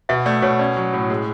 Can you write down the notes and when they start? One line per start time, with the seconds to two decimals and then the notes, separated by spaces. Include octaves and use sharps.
0.09 B2 E5
0.26 A3 D5
0.42 B2 C#5
0.59 C#4 D5
0.77 F#3
0.93 A2
1.10 G#3